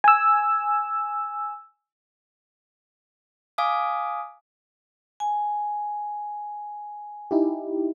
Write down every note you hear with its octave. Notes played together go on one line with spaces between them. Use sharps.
G#5 E6
F5 G#5 D6 D#6
G#5
D#4 E4 G4